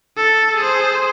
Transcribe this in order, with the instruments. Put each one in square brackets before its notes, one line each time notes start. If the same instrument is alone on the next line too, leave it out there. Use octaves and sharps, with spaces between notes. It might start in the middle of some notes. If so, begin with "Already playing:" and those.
[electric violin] A4
G#4 C5